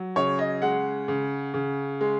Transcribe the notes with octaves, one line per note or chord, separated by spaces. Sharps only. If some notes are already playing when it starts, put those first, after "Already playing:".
Already playing: F#3
C#3 C#5
D#5
G#3 F#5
C#3
C#3
G#3